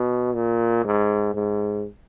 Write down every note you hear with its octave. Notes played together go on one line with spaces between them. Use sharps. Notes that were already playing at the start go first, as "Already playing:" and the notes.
Already playing: B2
A#2
G#2
G#2